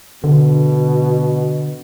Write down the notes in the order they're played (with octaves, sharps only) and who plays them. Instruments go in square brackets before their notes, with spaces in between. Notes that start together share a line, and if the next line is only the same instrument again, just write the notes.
[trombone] B2 [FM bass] D3